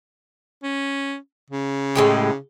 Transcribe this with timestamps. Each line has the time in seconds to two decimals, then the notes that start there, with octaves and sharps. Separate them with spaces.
0.63 C#4
1.50 C#3
1.95 A2 G#3 G4